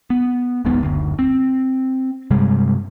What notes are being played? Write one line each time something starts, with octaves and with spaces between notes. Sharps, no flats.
B3
D1 A1 G#2 B3
F#1 D2
C4
G2 C3 G3 G#3